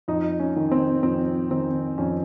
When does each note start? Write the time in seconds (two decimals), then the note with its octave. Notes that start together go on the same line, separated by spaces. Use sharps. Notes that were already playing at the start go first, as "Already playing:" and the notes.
0.08 F2 D#4
0.40 C#4
0.56 D#3
0.71 C4
1.03 F2 C4
1.50 D#3 C4
1.98 F2 C#4